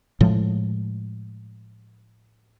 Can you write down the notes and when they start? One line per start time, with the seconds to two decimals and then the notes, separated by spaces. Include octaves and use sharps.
0.21 A2 F3 G#3